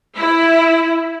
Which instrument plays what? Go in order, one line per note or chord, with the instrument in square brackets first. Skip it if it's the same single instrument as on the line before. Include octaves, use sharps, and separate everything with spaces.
[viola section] E4